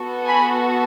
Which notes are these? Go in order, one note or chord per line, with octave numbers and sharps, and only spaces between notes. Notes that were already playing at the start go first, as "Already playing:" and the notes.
Already playing: B3 F#4 A4
G#5 B5